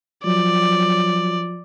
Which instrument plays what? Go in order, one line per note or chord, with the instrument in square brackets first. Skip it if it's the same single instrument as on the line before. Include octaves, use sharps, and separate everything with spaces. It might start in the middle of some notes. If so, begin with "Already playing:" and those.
[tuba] F3 [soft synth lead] F#3 [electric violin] D5